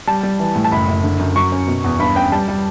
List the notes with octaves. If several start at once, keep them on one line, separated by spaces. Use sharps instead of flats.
G3 A5
G3
E3
A2
A5
F#1 B5
F#1
D3
F#2
F#3 C#6
C#4
B2
E2
G2 B5
C#4 G5
G3 A5
G3